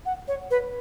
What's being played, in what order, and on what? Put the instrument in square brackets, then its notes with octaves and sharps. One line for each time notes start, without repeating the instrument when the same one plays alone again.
[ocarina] F#5
C#5
B4